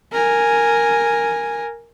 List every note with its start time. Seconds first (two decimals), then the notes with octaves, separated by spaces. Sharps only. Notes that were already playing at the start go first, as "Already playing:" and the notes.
0.12 A#4 G#5